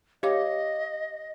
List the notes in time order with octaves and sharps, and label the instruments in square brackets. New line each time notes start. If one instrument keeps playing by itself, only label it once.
[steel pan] G4 [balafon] C#5 F5 D6 [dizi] D#5